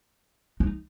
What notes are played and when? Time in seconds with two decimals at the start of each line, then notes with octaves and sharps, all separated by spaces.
0.60 D#4